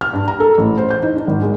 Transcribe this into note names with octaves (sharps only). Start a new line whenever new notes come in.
F6
G2
A#5
A4
A1
C5
G6
D#4
D4
G#1
G#3